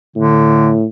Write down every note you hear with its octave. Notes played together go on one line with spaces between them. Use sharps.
A2 D3